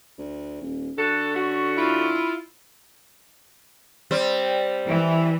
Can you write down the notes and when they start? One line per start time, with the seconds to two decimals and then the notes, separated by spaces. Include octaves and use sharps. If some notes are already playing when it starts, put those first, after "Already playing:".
0.18 D2
0.61 D#1
0.97 D3 F#4 A4
1.34 A3 C#4 F#4
1.77 E4 F4
4.11 G3 C4
4.87 E3